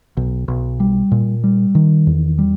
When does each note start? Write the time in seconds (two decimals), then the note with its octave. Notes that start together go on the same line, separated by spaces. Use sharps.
0.17 B1
0.48 B1
0.80 G3
1.11 A#2
1.44 G3
1.75 D#3
2.07 E2
2.38 G3